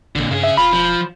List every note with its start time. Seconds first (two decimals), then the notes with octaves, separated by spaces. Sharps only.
0.16 A1 A#2 D3
0.31 G2 C#3 G#4
0.44 E5
0.57 E1 F4 B5
0.73 F3